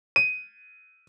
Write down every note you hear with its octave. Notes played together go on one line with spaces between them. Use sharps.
D#7